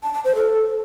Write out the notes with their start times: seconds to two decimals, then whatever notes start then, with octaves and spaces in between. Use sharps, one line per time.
0.03 A5
0.14 A5
0.24 C5
0.35 A4